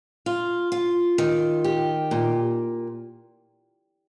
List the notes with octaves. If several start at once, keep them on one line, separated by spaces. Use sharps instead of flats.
F4
F4
D#3
G4
A#2